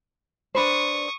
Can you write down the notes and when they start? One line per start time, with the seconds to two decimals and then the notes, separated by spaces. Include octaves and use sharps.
0.55 D4 B4 C5 C#6 D#6